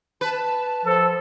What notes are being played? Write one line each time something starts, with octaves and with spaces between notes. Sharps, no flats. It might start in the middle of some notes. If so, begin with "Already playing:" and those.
B4 A5
F3 A4